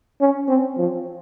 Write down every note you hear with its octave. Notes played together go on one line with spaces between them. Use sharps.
C#4
C4
F3